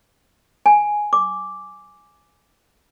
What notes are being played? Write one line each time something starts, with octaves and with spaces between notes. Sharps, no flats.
G#5
D6